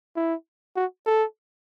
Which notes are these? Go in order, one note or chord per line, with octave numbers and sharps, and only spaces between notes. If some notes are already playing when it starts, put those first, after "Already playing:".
E4
F#4
A4